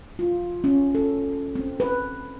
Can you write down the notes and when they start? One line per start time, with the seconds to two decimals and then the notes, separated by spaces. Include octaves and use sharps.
0.19 F4
0.64 C#4
0.95 A4
1.55 C4
1.80 B4